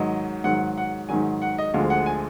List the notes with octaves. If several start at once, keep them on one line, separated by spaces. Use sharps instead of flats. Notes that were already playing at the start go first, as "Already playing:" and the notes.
Already playing: G#2 D#3 F#3 D#5
G#2 D#3 F#3 F#5
F#5
G#2 D#3 F#3 G#5
F#5
D#5
D2 D3 F3 G#3 F5
F#5
G#5